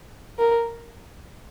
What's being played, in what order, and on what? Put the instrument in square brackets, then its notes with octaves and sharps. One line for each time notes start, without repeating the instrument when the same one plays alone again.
[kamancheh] A#4